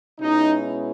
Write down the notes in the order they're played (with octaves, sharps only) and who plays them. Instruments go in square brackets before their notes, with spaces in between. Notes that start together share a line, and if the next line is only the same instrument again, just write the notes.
[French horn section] B2 G#3 C#4 E4 [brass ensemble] D#4